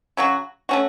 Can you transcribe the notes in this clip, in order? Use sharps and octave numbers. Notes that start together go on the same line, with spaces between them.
C#3 F#3 C#4 F#4
A3 C#4 F#4